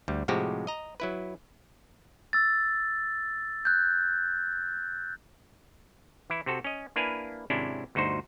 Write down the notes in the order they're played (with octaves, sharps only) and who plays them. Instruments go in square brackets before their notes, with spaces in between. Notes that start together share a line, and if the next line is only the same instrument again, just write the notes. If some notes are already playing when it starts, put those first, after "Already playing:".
[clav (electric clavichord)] D2 G3
A2 C3 F3 G#3 F#4 G4
D#5 A#5
F#3 E4 B4
[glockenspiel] E6 A6
F#6 G6
[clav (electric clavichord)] E3 E4
C3 C4 F#4 A4
C#4 D#5
A#3 D4 E4 B4 F5 G#5
G#1 C3 C#4 D4 E4
G1 D2 D#4 F#4 C5